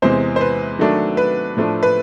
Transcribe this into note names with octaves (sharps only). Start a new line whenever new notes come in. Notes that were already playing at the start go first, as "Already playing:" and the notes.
E2 C3 E3 G#3 C5
C5
B4
D#3 F#3 A3 D4
B4
A2 F3 A3 D4
B4